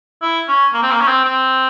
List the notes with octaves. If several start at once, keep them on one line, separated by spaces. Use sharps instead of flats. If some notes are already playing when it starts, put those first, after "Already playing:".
E4
C#4
A#3
C4
A#3
C#4
C4
C4